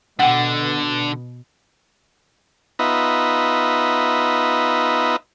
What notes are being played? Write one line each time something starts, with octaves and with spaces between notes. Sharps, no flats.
B2 D3 F#5 G5
B3 D#4 F4 B4 D#5 E5